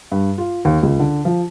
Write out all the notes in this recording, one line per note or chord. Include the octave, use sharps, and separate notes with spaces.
G2
F4
D#2
C#2
D3
F3